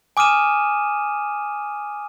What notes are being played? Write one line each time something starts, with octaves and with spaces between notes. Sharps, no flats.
G#5 D6 D#6 F6 D#7 E7